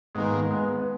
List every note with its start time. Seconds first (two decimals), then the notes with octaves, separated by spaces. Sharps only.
0.15 G#2 D#3 G#3 A#3 B3
0.50 G#3 B3
0.75 B3